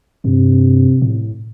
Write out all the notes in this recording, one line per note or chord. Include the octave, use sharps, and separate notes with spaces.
G2 C3
A2